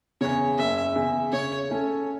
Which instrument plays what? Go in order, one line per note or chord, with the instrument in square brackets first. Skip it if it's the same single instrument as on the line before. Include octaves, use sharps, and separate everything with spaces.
[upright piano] E2 C#3 [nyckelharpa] C#5
[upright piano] F#1 [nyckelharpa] E5
[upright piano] E2 C#3
[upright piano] C#3 [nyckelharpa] C#5
[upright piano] A3 C#4 A4